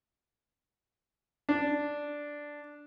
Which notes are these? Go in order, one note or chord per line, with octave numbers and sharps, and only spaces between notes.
D4